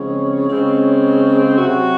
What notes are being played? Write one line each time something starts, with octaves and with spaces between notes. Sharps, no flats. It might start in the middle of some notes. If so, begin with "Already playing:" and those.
Already playing: C#3 F3 G#3 C4 C#5
C#3 G#3 C4
C3 F#3 C4 F#4